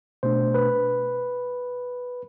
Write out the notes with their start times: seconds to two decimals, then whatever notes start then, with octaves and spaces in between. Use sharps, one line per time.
0.23 B2 A3 D4 C5
0.54 B4